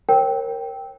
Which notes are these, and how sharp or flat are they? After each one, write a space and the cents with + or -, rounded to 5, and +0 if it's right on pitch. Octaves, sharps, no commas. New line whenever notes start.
A#4 +0 C#5 -45 G5 +0